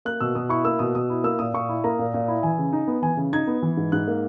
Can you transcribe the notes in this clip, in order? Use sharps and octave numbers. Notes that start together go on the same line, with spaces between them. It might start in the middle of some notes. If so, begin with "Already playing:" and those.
A#3 F#6
B2 E6
B2 D#6
E4 C#6
A#3 E6
B2 D#6
B2 D#6
E4
A#3 E6
A#2 D#6
A#2 C#6
E4
A#3 A#5
A#2
A#2
E4
E3 G#5
C#3
D#4
B3
E3 G#5
C#3
D#4 G#6
B3
E3
G#2
G#2 F#6
A#3